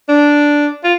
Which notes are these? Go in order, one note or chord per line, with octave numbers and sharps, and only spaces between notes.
D4
F4